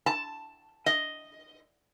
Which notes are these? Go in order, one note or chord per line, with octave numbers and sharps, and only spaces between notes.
A5
D#5